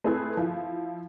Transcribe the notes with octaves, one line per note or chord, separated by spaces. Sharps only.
A3 C4 E4 G#4 A4 B4
F3 E4